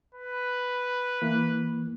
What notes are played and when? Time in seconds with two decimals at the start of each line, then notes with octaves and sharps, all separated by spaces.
0.14 B4
1.21 E3 A#3 F#6